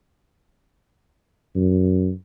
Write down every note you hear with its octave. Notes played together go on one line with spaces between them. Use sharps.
F#2